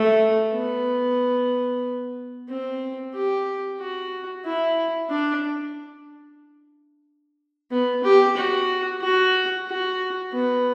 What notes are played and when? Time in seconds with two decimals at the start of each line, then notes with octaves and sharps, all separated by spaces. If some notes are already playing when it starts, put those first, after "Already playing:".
Already playing: A3
0.53 B3
2.49 C4
3.14 G4
3.80 F#4
4.45 E4
5.10 D4
7.71 B3
8.04 G4
8.37 F#4
9.02 F#4
9.67 F#4
10.32 B3